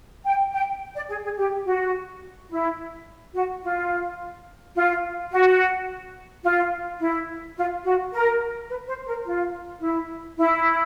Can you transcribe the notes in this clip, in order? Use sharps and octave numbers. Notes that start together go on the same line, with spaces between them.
G5
G5
D5
G#4
G#4
G4
F#4
E4
F#4
F4
F4
F#4
F4
E4
F4
F#4
A#4
B4
C5
A#4
F4
E4
E4